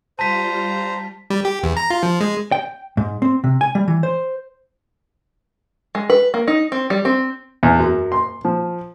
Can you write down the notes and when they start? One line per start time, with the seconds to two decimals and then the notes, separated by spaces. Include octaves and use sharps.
0.19 G3 F4 C5 A5 A#5 B6
1.30 G3
1.45 G4
1.63 E2
1.77 A#5
1.90 F4
2.03 F3
2.20 G#3
2.52 G5
2.97 G#2
3.22 C4
3.44 C3
3.61 G#5
3.75 G3
3.88 E3
4.03 C5
5.95 G#3
6.10 B4
6.34 A#3
6.47 D#4
6.72 C4
6.90 G3
7.05 C4
7.63 E2
7.79 F#2
8.12 C6
8.45 F3